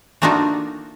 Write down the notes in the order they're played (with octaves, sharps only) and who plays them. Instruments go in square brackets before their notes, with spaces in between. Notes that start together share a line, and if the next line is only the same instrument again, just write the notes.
[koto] A3 A#3 D4 D#4 F4 F#4